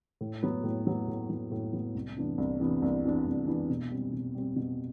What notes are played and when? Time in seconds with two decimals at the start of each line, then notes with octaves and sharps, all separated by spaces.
0.21 A2
0.43 F#3 B3
0.64 A2
0.86 F#3 B3
1.08 A2
1.30 F#3 B3
1.52 A2
1.73 F#3 B3
1.95 C2
2.16 C3 E3 B3 D4
2.38 C2
2.60 C3 E3 B3 D4
2.82 C2
3.04 C3 E3 B3 D4
3.26 C2
3.47 C3 E3 B3 D4
3.70 B2
3.91 G3 C4
4.13 B2
4.34 G3 C4
4.56 B2